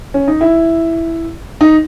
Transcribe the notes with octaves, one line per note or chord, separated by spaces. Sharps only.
C#4
D#4
E4
D#4